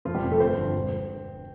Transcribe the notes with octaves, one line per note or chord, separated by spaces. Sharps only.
F1 F3 F4
G3 G4
F2 C3 F3
A3 A4
G1 C4 C5
G2 D3 F3
E1